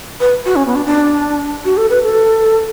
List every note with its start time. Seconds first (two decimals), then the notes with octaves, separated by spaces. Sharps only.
0.20 B4
0.46 F#4
0.56 C#4
0.67 B3
0.75 D4
0.86 D4
1.65 F#4
1.77 A4
1.90 B4
2.04 A4